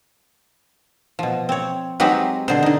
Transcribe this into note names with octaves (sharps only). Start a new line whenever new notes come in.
B2 F3
C4 C#5
F#3 G#3 C4 D#4 G4 B4
B2 D3 C5
D3 D#4